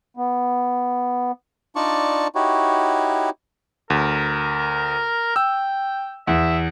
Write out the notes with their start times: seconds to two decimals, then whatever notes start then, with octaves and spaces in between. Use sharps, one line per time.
0.17 B3
1.76 D4 D#4 F4 D5 A5 C#6
2.35 D#4 E4 F#4 G4 C#5
3.90 D2 A#4
5.36 G5 E6
6.27 E2 E5